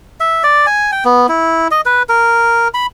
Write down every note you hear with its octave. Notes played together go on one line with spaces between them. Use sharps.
E5
D5
G#5
G5
B3
E4
D#5
B4
A#4
B5